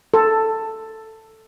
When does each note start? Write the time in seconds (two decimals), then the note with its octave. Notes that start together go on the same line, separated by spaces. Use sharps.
0.14 A4